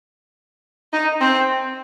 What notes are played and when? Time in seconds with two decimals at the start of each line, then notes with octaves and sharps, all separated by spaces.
0.93 D#4
1.20 C4